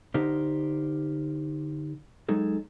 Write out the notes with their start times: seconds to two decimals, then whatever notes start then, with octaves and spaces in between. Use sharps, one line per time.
0.14 D3 D#4 G4 A#4 C5
2.29 F#3 G#3 D#4 G#4 A4